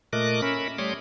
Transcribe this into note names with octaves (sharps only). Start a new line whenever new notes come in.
A#2 A3 A#4 D#5 D6 F#6
C#4 A#4 E5 B5
G3 A3 C#5 C6 D6 D#6